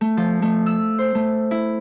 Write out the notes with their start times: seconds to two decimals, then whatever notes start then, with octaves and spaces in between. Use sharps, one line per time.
0.01 A3
0.17 F3
0.42 A3
0.66 E6
0.99 C5
1.15 A3
1.51 E4